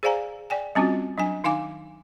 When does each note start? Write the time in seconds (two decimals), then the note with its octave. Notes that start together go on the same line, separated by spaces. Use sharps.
0.03 G#4 C5 D5 F5 G#5 A#5
0.50 D5 G5 G#5
0.75 G3 C4 C#4 F4 F#4
1.18 F#3 D4 G#5
1.44 D#3 D#4 F5 G#5 D6